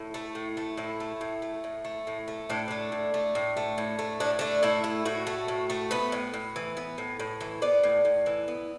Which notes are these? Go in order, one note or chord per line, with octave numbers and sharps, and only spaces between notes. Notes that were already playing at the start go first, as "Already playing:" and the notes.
Already playing: A2 E4
A3
A2
A3
A2 E4
A3
A2
A3
A2
A3
A2
A3
A2 D4
A3 D4
A2
A3
A2
A3
A2
A3
A2 D4
A3 D4
A2 E4
A3
A2 F#4
A3
A2
A3
B3 B4
A2
A2
E3
B3
A2
A2
E3
B3 D5
A2
A2
E3
B3